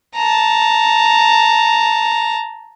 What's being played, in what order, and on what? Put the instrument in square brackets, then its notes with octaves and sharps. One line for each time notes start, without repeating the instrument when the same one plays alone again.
[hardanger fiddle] A5 A#5